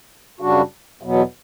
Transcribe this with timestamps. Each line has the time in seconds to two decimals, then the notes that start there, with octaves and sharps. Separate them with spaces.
0.40 F#2 C#3 G3 D4 F#4
1.01 E2 B2 F#3 B3